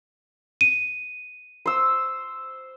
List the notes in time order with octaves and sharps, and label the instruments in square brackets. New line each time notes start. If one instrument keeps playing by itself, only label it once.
[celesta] D#7
[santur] C5 E6